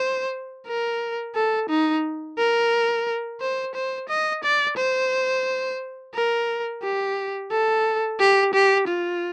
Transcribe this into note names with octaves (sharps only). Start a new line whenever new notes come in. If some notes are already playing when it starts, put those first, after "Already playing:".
Already playing: C5
A#4
A4
D#4
A#4
C5
C5
D#5
D5
C5
A#4
G4
A4
G4
G4
F4